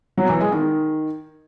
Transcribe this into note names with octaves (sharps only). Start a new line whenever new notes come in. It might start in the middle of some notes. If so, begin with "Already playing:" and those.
F#3
E3
G#3
D#3